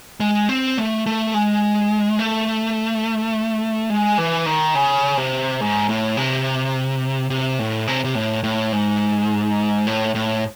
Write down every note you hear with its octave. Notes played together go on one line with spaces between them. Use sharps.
G#3
C4
A3
A3
G#3
A3
G#3
E3
D#3
C#3
C3
G#2
A2
C3
C3
A2
C3
C3
A2
A2
G#2
A2
A2